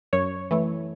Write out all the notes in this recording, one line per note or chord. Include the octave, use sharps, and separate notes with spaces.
F#2 C#5
E3 A3